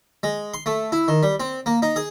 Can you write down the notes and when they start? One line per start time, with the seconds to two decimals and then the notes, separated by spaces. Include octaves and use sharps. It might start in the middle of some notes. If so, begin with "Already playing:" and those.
0.23 G#3
0.54 C6
0.66 A3
0.92 E4
1.08 D#3
1.23 G3
1.40 C4
1.66 A#3
1.82 D#4
1.96 G#4